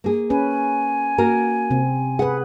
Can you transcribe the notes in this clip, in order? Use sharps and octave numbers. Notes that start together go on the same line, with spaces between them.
A#3 G#4
C#4 B4 G#5
A#3 F#4 A#4
C3 C4
G#4 B4 F#5